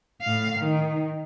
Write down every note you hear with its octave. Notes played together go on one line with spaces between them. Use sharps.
A2 F5
D#3